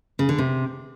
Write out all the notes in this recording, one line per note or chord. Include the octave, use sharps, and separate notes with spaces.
C#3
D3
C3